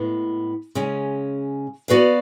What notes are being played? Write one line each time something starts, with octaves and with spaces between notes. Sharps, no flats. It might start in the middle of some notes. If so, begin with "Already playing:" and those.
Already playing: A2 G#3 B3
C#3 G#3 C#4
B3 F#4 B4 D5 F5